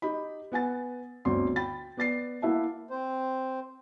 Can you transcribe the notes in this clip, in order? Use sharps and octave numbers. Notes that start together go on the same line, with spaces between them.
D#4 G4 D#5 B5
B3 F#5 G#5 A6
G1 D2 C4 D5 C6
G5 B5 A6
B3 D5 A6 C7
A#3 E4 E5 F#5 A5
C4 C5